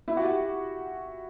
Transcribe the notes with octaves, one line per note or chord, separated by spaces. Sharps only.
E4
F#4
G4